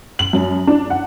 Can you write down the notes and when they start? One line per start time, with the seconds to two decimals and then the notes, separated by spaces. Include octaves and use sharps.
0.19 F#7
0.33 F#2
0.67 D4
0.90 F#5